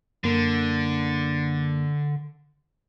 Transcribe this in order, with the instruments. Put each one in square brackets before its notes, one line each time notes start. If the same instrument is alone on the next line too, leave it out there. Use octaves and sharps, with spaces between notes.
[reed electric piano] F#2 A#3 [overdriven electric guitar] D3